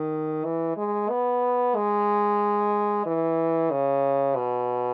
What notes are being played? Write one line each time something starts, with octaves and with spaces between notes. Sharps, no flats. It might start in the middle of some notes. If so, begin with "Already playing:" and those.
Already playing: D#3
E3
G#3
B3
G#3
E3
C#3
B2